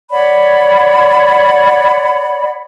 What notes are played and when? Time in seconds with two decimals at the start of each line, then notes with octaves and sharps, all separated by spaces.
0.11 C#5 D5 F#5 B5